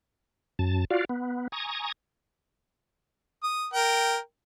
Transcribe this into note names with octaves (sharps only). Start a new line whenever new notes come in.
F#2 A5
F4 F#4 D5 F5
B3
G#5 A#5 C#6 D#6
D#6
A#4 G5